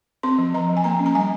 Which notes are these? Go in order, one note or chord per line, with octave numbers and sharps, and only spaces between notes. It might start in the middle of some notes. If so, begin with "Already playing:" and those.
C4 C6
F3
F3 A#5
F3
G#5
A#3 A#5
C#4
A#5
G3 G#5